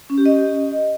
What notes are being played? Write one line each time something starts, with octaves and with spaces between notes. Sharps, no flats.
C#4
G4
D#5